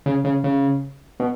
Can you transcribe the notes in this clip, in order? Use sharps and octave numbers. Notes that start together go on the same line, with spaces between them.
C#3
C#3
C#3
B2